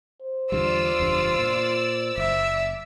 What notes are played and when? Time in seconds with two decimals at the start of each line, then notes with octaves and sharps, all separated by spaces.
0.22 C5
0.52 E2 D3 G3 F4 D5 E6
1.00 F#1 E2 G2
1.38 A#2
2.18 F#1 E5